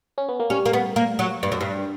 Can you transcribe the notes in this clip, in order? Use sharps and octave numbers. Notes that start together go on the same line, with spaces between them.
C#4
B3
A#3
G3 C#4
A#3
B3
A#3
F#3
G2
F#2
G2